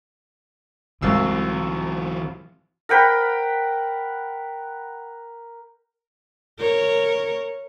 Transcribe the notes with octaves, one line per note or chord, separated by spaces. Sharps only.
C2 E3 F#3 G#3 F5 E6
A#4 F#5 G5 B5
A#4 C#5